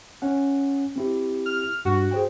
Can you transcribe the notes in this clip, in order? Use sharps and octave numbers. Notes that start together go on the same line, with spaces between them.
C#4 F#5
C4 E4 G4
F6
G2 F#4
G#4 C5 G5